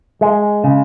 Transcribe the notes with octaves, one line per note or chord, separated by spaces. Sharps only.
G#3
C#3